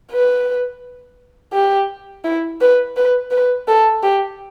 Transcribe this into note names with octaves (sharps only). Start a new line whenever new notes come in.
B4
G4
E4
B4
B4
B4
A4
G4